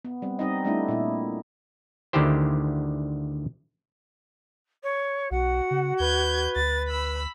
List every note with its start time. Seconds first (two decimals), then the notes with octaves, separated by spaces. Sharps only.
0.05 B3
0.22 G3 C4
0.39 G3 C4 D#4 D#5
0.65 G3 A3 D4 E4
0.88 A#2 E4
2.13 D2 D3 D#3 E4 G4 C5
4.83 C#5
5.31 B1 F#4 F#5
5.71 C#3
6.00 D#2 B4 G6 G#6
6.56 D2 A6
6.89 B5 E6